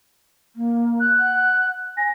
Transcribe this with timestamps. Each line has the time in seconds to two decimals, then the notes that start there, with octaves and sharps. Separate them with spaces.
0.56 A#3
1.00 F#6
1.19 F#5
1.97 G#5 A#6